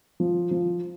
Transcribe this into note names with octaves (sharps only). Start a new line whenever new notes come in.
F3
F3